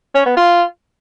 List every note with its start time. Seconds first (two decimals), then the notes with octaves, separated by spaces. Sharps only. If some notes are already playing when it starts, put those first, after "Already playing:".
0.15 C#4
0.26 B3
0.37 F4